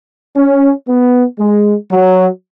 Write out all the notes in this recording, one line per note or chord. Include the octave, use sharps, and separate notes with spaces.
C#4
B3
G#3
F#3